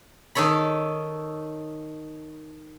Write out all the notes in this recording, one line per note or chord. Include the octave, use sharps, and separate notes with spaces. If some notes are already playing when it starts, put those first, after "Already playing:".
D#3 D#4 A4 C#5 B5